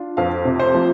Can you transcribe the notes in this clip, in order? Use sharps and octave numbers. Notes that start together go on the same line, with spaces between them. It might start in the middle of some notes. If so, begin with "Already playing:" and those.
Already playing: D4 F4
F2 F5
C3
C5
F3